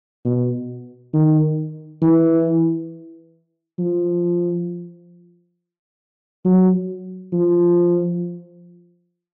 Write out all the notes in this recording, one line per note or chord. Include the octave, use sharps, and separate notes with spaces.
B2
D#3
E3
F3
F#3
F3